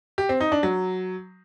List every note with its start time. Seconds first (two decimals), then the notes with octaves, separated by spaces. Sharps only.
0.18 G4
0.29 C4
0.40 D#4
0.52 D4
0.63 F#3